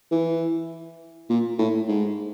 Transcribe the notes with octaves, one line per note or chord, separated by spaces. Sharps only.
E3
A#2
A2
G#2